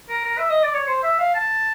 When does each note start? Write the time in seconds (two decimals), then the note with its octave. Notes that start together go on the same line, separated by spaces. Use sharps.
0.09 A#4
0.24 A#4
0.38 E5
0.50 D#5
0.63 D5
0.75 C#5
0.87 C5
1.03 E5
1.19 F5
1.35 A5